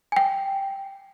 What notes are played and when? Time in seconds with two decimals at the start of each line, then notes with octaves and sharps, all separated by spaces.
0.12 G5 G#5